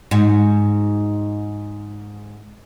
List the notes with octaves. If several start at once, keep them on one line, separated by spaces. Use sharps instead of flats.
G#2 F#4